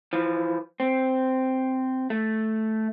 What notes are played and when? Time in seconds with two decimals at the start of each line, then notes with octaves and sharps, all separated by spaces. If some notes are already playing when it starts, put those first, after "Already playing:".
0.13 E3 F3
0.80 C4
2.10 A3